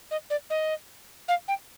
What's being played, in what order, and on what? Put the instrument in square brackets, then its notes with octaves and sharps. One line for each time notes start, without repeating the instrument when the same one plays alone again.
[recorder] D#5
D5
D#5
F5
G5